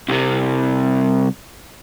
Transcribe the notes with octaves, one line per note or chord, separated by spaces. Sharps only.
C2 C3